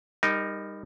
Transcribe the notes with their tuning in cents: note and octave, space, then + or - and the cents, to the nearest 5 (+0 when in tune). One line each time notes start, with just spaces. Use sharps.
G3 +25 D#4 +0 A#4 +0